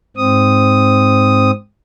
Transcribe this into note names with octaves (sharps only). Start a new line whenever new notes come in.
G#2 C4 D#6